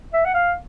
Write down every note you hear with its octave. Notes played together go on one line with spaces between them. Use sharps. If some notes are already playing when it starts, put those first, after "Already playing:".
E5
F#5
F5